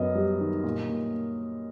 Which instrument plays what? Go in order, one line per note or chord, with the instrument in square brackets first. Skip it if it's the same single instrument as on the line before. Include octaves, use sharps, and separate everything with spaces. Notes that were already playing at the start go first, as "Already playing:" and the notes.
Already playing: [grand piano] F#2 B3 D#5
G3
D#3
A#2
A#2